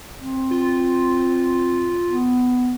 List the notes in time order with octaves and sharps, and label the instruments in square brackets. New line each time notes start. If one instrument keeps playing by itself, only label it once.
[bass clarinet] C4
[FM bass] F4
[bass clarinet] B3